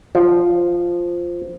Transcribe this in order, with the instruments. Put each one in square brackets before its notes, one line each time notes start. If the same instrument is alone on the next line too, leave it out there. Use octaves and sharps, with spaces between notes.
[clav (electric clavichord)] F3